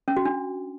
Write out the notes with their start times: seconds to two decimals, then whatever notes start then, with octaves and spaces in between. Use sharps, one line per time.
0.08 C#4
0.16 F#4
0.25 D4